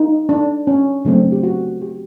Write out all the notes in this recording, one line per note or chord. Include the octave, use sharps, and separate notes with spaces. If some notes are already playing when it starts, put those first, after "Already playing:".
Already playing: D#4
D4
C#4
C#3 F#3 A3 C4 D4
G4
F#4
G4